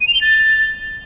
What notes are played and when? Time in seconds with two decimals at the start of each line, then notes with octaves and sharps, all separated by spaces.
0.01 D#7
0.07 F7
0.14 G7
0.21 A6